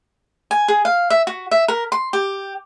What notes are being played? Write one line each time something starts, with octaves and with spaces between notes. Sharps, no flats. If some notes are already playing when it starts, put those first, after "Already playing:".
G#5
G#4
F5
E5
F#4
E5
A#4
C6
G4